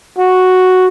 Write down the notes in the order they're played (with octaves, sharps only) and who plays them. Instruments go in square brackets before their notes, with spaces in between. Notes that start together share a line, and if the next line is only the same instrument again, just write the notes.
[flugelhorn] F#4